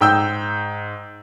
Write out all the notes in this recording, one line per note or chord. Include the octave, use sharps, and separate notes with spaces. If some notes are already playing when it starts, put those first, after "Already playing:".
G#2 G5 E6 G6